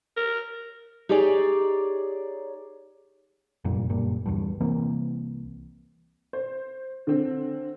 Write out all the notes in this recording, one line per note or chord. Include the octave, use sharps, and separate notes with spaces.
A#4
D#4 G4 G#4 C#5 D5
F1 F#2 A#2 G3
F#1 G2 A#2
G1 E2 G2
C2 E3 A#3 C4
C5
D3 C4